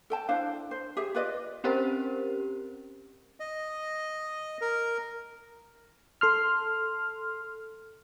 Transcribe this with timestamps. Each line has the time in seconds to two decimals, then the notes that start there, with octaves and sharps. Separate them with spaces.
0.10 A4 G5 A5
0.28 D4 E4 C5 F5
0.71 C5
0.97 G4 G#4 E5
1.15 F4 B4 D5 D#5
1.64 C4 C#4 G4 A#4 C5
3.40 D#5
4.61 A#4
6.21 A4 C6 F6